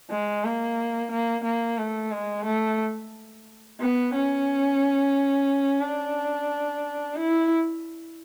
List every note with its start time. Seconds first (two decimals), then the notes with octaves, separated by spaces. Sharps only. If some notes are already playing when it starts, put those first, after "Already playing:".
0.10 G#3
0.44 A#3
1.11 A#3
1.44 A#3
1.78 A3
2.11 G#3
2.45 A3
3.80 B3
4.14 C#4
5.81 D4
7.16 E4